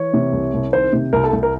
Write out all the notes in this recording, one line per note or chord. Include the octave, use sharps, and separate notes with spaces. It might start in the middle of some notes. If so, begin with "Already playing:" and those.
Already playing: E3 C#5
C3
C2
C2
D#3 C5
C3
C2 A#4
A4
C2
A#4